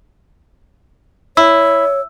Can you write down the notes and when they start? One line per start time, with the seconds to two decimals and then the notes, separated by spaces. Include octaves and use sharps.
1.37 E4 C#5 E6